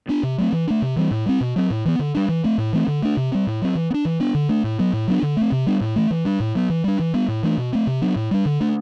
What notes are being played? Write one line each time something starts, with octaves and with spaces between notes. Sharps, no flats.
B3 D4
C3
F#3 A3 C4
E3
A3 D4
C3
E3 G3 C4
A2
G3 C4
B2
F#3 C4
A2
E3 B3
D3
G3 D4
E3
A3 C4
A2
E3 A3 C4
D3
A3 D4
C3
G3 C4
A2
F#3 C4
E3
B3
D4
E3
B3 D4
D3
A3 D4
A2
F#3 B3
A2
F#3 B3 D4
D3
A3 C4
C3
G3 B3 D4
A2
E3 A3
E3
G3 D4
A2
F#3 B3
E3
G3 D4
E3
G3 B3
A2
E3 A3 D4
B2
A3 C4
C3
F#3 B3 D4
A2
G3 D4
D3
A3 D4